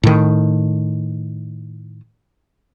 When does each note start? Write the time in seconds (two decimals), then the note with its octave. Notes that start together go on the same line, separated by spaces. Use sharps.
0.03 A2 D#3